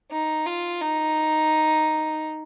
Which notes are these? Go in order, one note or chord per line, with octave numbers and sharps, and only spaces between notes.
D#4
F4
D#4